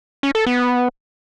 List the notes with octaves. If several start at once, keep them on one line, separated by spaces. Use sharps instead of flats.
C#4
A4
B3